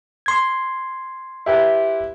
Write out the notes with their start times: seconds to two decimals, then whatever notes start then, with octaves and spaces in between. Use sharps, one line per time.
0.26 C6 G#6
1.46 E4 G4 B4